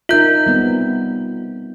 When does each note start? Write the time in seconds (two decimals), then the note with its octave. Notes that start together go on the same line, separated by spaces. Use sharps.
0.09 D#4 F4 A#4 E5 G6
0.47 G3 B3 C4